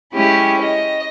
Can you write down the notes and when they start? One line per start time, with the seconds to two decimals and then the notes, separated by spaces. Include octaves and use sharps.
0.13 G#3 C#4 E4 G4
0.61 D#5